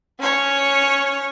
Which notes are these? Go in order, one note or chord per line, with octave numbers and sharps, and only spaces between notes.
C#4 C#5